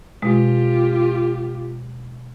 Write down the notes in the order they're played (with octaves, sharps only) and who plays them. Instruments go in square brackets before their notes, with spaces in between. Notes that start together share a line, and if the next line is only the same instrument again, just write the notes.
[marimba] B2 G#3 [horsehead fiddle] F4 G4